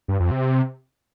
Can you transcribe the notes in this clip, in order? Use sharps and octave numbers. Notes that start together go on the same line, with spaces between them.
G2
F2
C3